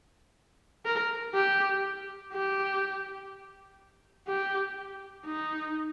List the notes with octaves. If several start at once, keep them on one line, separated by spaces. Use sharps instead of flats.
A#4
G4
G4
G4
D#4